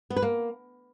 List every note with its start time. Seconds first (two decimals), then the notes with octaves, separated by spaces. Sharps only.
0.10 B3
0.16 B4
0.22 A#3